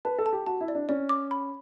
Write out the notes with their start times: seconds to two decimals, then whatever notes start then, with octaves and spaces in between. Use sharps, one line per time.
0.05 B4 A5
0.18 A4
0.26 A5
0.33 G4
0.47 F#4 A5
0.61 E4
0.68 D5
0.75 D4
0.89 C#4 D5
1.09 D6
1.31 B5